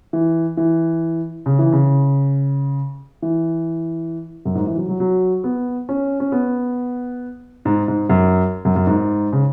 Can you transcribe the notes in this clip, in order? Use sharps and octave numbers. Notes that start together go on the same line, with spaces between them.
E3
E3
C#3
E3
C#3
E3
F#2
G#2
E3
F#3
F#3
F#3
B3
C#4
C#4
B3
G#2
G#2
F#2
F#2
F#2
G#2
C#3